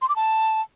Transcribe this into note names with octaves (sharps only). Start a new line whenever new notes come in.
C6
D6
A5